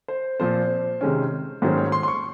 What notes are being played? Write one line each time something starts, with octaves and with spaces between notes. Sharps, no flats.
C5
A#2 F3 C4 C5
C3 D#3 G#3 C#4
G#2 D#3 F#3 A#3 C#4 C5
C#5
C6
C6
C#6